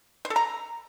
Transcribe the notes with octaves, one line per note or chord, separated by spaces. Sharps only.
C5
A4
A#5